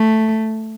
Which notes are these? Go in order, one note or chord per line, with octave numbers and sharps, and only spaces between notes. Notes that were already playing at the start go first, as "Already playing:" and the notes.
Already playing: A3